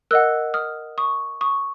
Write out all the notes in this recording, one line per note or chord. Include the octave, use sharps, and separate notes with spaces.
A#4 D#5 F#5 E6 F#6
D#6 F6
C#6 D#6
C#6 D#6